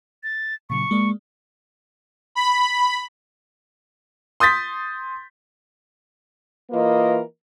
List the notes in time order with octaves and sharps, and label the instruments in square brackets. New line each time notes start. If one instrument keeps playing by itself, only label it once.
[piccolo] A6
[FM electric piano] A#2 C#3 F#3 [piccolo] C#6
[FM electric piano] G#3 A#3 D5
[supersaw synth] B5
[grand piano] C6 D#6 G6 A6 B6
[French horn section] E3 A#3 F4 A#4 B4 D#5